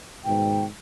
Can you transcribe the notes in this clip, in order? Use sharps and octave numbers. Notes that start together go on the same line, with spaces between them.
G#2 B2 D#3 G5